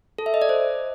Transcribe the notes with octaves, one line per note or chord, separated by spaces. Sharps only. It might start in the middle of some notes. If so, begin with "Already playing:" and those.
A4
E5
D#5
D5
C5